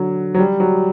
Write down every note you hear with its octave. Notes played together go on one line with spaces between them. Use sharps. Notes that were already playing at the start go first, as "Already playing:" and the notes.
Already playing: D3 F#3
F#3
G3
F#3